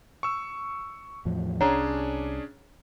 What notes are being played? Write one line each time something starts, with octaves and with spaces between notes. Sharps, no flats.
C#6 E6
E2 A2 F3
C2 C#4 D4 G#4 C#5 F#5 A#5